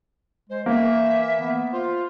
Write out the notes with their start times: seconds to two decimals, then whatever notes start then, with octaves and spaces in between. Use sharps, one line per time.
0.50 G#3 C5
0.66 E3 A#3 E5
1.40 B3
1.72 F4 C5